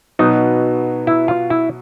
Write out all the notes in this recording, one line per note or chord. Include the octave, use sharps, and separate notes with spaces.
B2 F#3 B3 D#4
E4
F4
E4